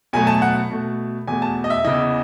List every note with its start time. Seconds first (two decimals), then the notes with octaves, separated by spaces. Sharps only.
0.13 B2 F#3 A3 G#5
0.27 A5
0.42 F#5
0.70 B2 A3
1.27 E2 B2 A3 G#5
1.42 A5
1.64 D#5
1.70 E5
1.85 E2 C#3 E3 D#5